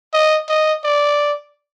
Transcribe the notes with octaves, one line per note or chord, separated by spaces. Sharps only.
D#5
D#5
D5